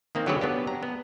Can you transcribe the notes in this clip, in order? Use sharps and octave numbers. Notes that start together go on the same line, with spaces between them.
D#3 A#3 C4
D3 F#3 G4 G#4 B4 C#5
B3 D4 G4
A#5
B3